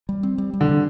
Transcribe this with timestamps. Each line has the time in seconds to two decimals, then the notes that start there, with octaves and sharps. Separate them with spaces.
0.09 G3
0.23 C4
0.38 G3
0.53 G3
0.61 D3
0.69 C3